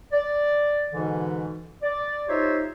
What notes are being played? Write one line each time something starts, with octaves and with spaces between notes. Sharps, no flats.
D5
G#2 B2 D3 E3
D5
D#4 F4 G4 C5 C#5 E5